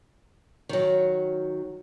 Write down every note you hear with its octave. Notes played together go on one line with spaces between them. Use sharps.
D#3 F#3